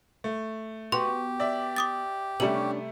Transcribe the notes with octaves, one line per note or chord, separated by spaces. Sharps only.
A3
B3 F#4 G4 C6
D5 E5
D6 D#6 A6
C3 G3 A3 C#4 D4 F#7